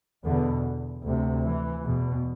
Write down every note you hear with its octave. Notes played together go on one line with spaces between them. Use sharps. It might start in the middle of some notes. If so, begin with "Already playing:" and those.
E2 B2 D3
D2 C3
E3
E2 B2